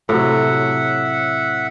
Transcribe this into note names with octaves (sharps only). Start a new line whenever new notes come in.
A2 C3 F#3 E5 F#5